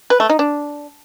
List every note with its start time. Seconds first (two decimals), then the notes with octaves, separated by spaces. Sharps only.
0.10 B4
0.20 A3
0.29 D#4
0.39 D4